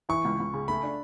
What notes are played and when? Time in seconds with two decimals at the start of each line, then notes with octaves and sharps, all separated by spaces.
0.09 E3 C#6
0.25 C#2
0.39 C#2
0.53 C#3
0.68 A3 B5
0.83 D4